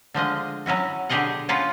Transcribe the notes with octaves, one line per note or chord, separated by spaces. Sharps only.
D3 F3 G#3 D#5
F#3 C#4 E4 F#4
B2 D3 G4 G#4 D#5 F#5
A#3 C#4 F4 B4 D5 F#5